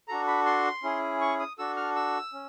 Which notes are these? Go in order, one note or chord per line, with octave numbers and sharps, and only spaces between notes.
D4 F#4 A4 A#5
B5
C6
C#4 E4 G#4
C#6
D#6
D4 F#4 A4 E6
F6
E6
C#4